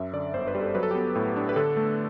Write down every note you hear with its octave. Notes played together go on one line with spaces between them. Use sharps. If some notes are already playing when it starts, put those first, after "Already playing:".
Already playing: F#2 E5
D3 D5
G1 C5
B4
G3
A4
F#3 B4
A4
G4
B3 A4
A2
D4
B4
D3 A4
A3